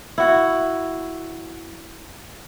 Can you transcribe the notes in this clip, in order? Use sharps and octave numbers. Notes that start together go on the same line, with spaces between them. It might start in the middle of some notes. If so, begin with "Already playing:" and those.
E4 F#4